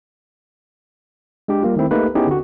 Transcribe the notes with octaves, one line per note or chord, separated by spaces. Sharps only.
G#3 D4 G4
G3 A#3 F4
D#3 A3 C4 E4
A3 A#3 D#4 G4 B4
B3 C#4 D#4 E4 G4 G#4
D3 F#4